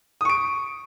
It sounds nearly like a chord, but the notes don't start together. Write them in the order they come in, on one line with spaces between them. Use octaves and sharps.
D#6 C#6 D7